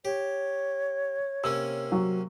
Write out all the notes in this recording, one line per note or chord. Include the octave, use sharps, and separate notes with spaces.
G4 C#5
C3 A#3 C#4 E6
F#3